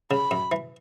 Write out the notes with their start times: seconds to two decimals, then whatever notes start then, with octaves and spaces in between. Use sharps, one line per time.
0.11 C#3 B5
0.31 F#2
0.52 E3